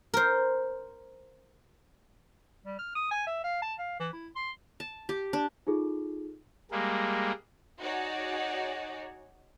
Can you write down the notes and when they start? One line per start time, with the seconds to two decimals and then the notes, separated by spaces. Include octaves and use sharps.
0.14 A#4 C5
2.66 G3
2.79 F6
2.95 D#6
3.11 G#5
3.27 E5
3.44 F5
3.62 A5
3.79 F5
4.00 E3
4.13 E4
4.36 C6
4.80 A5
5.09 G4
5.33 D4
5.67 D#4 F4 G#4 A4
6.71 G3 G#3 A#3
7.81 D#4 F#4 G#4 C#5 D5